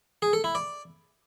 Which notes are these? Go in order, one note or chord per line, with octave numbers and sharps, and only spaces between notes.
G#4
A4
E4
D5